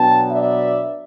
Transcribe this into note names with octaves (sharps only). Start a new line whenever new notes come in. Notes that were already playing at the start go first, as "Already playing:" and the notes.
Already playing: B2 F#3 B3 D4 G5 A5
D5 E5